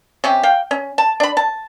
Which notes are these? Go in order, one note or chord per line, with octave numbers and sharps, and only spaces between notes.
C3 C#4 G4
F5 G5
C#4
A5
D4 B5
A5